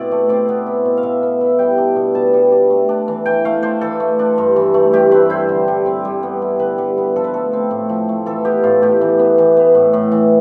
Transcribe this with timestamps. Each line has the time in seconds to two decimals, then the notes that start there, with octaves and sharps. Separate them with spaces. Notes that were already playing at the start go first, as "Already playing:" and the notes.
Already playing: B2 C4 E4 D5
0.11 A3
0.29 C4 D5
0.49 B3
0.66 E4
0.85 B2
0.97 F5
1.03 B2 E5
1.23 B3
1.41 E4
1.59 G3 G5
1.78 D4
1.96 B2
2.15 B2 A5
2.33 G3
2.52 D4
2.70 A3
2.89 D4
3.08 E3
3.26 E3 G5
3.45 A3 F5
3.63 D4 C5
3.81 E3 A4
4.00 A3
4.19 D4
4.38 G2
4.56 E3
4.74 A3
4.93 G3 G4
5.11 C4 B4
5.30 E4 C5
5.49 D3
5.68 G3
5.86 C4
6.05 G3
6.23 B3
6.42 E4
6.59 D3 B4
6.78 G3
6.97 B3
7.16 F3 A4
7.24 B4
7.34 A3 A4
7.53 C4
7.71 A2
7.89 F3
8.09 A3
8.26 E3 A4
8.45 B3 G4
8.63 A2 F4
8.82 A2 G4
9.01 E3
9.19 B3
9.38 E3
9.57 B3
9.75 A2
9.93 A2
10.11 E3